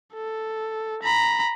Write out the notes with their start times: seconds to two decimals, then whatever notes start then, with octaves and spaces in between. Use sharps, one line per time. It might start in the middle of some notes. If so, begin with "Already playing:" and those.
0.14 A4
1.02 A#5 B5